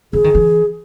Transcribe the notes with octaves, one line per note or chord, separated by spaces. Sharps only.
E3 G#4
D#3
E3